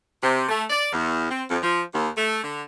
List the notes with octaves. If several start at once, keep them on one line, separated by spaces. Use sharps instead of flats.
C3
A3
D5
E2
C4
F2
F3
D#2
A3
D3